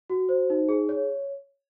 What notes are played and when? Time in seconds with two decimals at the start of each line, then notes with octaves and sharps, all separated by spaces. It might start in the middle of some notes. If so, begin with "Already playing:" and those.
0.10 F#4
0.29 C5
0.50 D#4
0.69 G#4
0.89 C#5